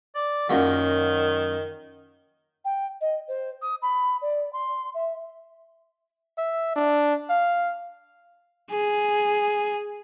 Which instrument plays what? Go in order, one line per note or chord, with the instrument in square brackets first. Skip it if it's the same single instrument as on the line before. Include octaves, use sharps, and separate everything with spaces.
[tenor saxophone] D5
[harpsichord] F#2 A#2 F#3 [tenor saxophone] D#3
[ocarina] G5
D#5
C5
D#6
B5
D5
C6
E5
[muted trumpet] E5
D4
F5
[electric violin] G#4